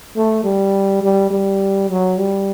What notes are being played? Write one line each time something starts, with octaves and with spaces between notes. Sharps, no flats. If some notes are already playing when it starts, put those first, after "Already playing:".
A3
G3
G3
G3
F#3
G3